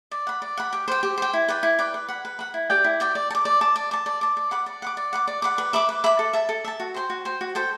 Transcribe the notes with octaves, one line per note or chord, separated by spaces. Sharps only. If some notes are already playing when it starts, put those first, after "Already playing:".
D5
F#5 B5
D5
F#5 B5
G4
C5 G5
G4
C5 G5
E4
B4 D5 G5
E4
B4 D5 G5
B4
F#5 B5
B4
F#5 B5
E4
G4 D5 G5
E4
G4 D5 G5
D5
A5
D6
D5
A5 D6
D5
A5 D6
D5
A5 D6
D5
F#5 B5 D6
D5
F#5 B5 D6
D5
F#5 B5 D6
D5
F#5 B5 D6
B4
E5 B5 D6
B4
E5 B5 D6
A4
E5 A5
A4
E5 A5
F#4
C5 G5 C6
F#4
C5 G5 C6
F#4
A4 C5 G5